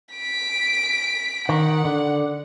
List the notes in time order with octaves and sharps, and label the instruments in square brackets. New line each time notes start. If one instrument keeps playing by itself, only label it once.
[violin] B6 D7
[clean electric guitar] D#3 [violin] F#5
[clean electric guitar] D3